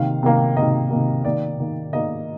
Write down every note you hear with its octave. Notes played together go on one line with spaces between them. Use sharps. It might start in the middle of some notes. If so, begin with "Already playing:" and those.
Already playing: C3 D#3 A#3 F5
C3 D#3 A#3
C3 D#3 A#3 D#5
C3 D#3 A#3
D#3 A#3 D5
D#3 A#3
D#3 A#3 D#5